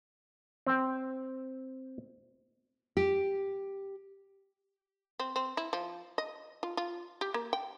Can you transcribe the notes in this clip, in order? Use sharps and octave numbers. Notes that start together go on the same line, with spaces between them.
C4 G5
G4
C4
C4
E4
F3
D#5
F4
F4
G4
A#3
G5